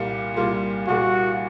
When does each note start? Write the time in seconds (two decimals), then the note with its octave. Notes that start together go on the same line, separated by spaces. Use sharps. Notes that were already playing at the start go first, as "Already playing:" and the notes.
Already playing: C2 A#2 G3 A#3
0.36 C2 A#2 G3 A#3 F4
0.88 C2 A#2 G3 A#3 F#4